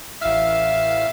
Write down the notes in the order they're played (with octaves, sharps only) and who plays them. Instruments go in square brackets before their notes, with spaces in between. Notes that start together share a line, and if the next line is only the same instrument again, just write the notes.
[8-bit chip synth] A1 F5 [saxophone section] E5